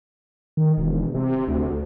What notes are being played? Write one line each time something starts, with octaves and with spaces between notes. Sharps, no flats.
D#3
E1
C3
D2